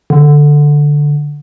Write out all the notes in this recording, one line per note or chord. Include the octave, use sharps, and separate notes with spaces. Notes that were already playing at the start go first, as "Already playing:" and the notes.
D3